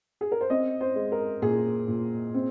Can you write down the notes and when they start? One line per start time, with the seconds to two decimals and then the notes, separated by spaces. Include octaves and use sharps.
0.21 G#4
0.32 A#4
0.41 C5
0.50 C4 D#5
0.81 C5
0.96 G#3
1.12 A#4
1.42 A#2 G#4
1.88 A#2
2.34 C4